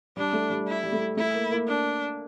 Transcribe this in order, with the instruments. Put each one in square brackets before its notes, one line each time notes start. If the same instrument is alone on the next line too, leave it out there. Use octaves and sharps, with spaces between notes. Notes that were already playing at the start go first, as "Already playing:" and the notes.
[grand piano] G3 [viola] D4
[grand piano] A3
G3
[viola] E4
[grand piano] G3
A3
[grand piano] A3 [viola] E4
[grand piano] A#3
A#3
[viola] D4